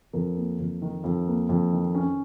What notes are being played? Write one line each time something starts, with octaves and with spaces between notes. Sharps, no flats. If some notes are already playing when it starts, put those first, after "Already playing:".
F2 A#4
A#3
F2
D#3
F2
A#3
F2
D#3
C#4